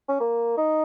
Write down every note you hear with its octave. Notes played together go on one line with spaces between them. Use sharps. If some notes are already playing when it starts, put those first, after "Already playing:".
C#4
A#3
D#4